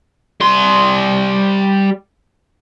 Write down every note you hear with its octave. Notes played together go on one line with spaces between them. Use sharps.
G3 C6